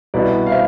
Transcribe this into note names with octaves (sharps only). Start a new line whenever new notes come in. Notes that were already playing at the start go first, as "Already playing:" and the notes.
C2 B2 B3 E4 B4 D5
F5
C5 E5